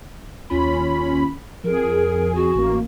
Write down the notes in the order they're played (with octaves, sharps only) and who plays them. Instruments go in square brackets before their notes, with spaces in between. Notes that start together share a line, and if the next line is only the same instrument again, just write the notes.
[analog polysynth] D#2 C#4 B5 [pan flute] F4
[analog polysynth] F2 G#4 [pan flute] A#4
[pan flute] F#4
[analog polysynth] A1 A#3